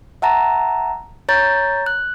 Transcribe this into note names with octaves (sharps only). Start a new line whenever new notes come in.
E5 F#5 A5 A#5
C#5 A#5 G6 A6
F#6